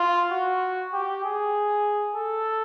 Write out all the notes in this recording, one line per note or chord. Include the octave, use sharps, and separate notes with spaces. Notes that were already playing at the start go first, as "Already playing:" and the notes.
Already playing: F4
F#4
G4
G#4
A4